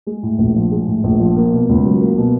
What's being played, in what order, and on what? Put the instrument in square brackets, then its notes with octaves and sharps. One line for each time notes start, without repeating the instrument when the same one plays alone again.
[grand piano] G#3
A2
A#1
F3
G#3
A2
A#1
F3
A#3
B2
C#2
F#3
A#3
B2